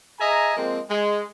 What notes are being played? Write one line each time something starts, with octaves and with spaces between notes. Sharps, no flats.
G#4 D#5 E5 G#5 A#5
F3 G#3 A#3 C4
G#3